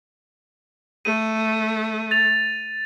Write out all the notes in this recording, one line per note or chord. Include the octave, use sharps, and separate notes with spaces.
A3 D#7
A6 F7